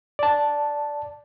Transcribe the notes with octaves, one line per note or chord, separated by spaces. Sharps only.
D5 A5